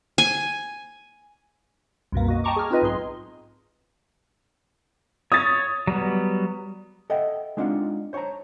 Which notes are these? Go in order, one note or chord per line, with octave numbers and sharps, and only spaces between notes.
G#5
C2 F#2 B2 A#3
A#3 F#4 D#5
D#5 G5 A5 A#5 C#6 D6
G#4 F6
C4 D#4 F4 B4 D#5
B1 G#2 G#4 C6
C#5 D#6 G#6 A6
F#3 G3 B3
A4 D#5 E5 F#5 G5
G#3 C4 D4 D#4 F4 F#5
C5 C#5 F#5 A5 A#5